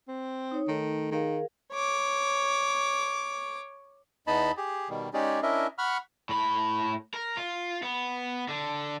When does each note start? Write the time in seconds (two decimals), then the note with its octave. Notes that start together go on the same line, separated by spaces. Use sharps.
0.08 C4
0.51 D#4 C#5
0.68 D#3 A3 A4
1.11 D#3 G#4 A#4 F5
1.72 C#5 D6
4.27 E2 B3 D#4 D#5 A5 B5
4.57 G4 G#4
4.89 B2 D#3 G3
5.13 G#3 C#4 D#4 G4 G#4 D5
5.42 C#4 D4 E4 A#4 D#5 E5
5.78 F#5 B5 C#6 F6
6.29 A2 B5
7.14 A#4
7.37 F4
7.83 B3
8.49 D3